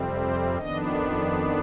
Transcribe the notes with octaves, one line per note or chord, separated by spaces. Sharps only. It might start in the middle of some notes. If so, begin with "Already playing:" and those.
Already playing: F2 C3 G3 C4
C5
F2 D#3 B3 D4 D#5